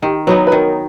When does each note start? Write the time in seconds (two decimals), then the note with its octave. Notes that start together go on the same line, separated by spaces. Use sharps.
0.02 D#3 G4
0.27 F#3 B3 D#4 B4
0.47 B4
0.52 D#3 A#4